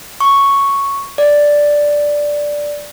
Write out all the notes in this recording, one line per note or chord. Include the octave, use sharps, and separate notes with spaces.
C#6
D5